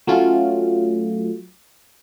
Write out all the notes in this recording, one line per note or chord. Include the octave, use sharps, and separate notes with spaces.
F#3 A3 C#4 F4